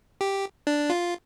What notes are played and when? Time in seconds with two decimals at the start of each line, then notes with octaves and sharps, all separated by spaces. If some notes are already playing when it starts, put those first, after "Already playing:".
0.21 G4
0.67 D4
0.90 F4